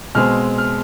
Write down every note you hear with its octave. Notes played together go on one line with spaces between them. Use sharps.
B2 G#3 C4 F6
F6